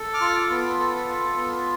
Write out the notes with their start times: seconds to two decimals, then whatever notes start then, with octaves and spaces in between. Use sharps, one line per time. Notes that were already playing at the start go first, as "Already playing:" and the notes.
Already playing: A4
0.14 D6 F6
0.21 F4
0.51 B3
0.79 A4
1.08 F4
1.37 B3